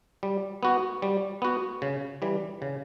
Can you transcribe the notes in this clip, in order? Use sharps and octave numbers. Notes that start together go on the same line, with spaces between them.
G3
B3 F#4
G3
B3 F#4
C#3
E3 G3
C#3